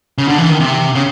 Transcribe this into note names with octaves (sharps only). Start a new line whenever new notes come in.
C#3
D3
E3
D#3
C3
C#3